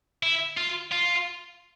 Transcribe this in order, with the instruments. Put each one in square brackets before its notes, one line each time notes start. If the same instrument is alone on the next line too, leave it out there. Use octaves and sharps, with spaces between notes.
[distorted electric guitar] E4
F4
F4